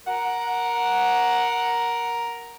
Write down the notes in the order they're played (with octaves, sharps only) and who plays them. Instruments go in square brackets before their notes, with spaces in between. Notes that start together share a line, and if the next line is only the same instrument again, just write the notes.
[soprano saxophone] A#4 [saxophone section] F#5